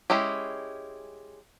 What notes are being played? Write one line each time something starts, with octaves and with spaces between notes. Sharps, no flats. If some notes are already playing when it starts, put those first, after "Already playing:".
G#3 C#4 E4 G4